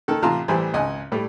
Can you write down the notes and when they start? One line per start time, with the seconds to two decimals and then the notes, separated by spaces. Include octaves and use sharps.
0.08 D#3 A4
0.23 A1 C3 F4 A5 A#5
0.48 A1 E3 G3 C5 G#5
0.73 G#1 C#2 D#5 G#5
1.12 A2 G3 A3